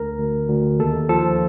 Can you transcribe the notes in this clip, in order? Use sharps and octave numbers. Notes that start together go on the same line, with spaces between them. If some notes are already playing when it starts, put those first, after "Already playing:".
Already playing: D2 A#4
D2
D2
D#2 A4
F3 A4